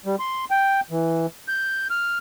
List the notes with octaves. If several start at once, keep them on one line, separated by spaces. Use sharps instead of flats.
G3
C6
G5
E3
G6
F6